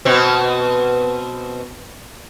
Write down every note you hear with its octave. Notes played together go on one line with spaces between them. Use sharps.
B2 C4